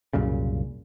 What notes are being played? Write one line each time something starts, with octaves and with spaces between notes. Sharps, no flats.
C2 F#2 A#2 C#3